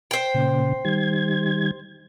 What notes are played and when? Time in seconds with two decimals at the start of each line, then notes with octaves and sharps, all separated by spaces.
0.11 C5 G5
0.34 A#2 C#3
0.85 D#3 G3 G#6